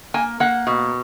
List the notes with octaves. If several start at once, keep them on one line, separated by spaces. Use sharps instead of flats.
A#3 G#5
A#3 F#5
B2